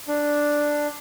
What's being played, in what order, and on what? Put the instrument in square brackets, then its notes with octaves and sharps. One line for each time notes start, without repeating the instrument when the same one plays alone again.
[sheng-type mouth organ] D4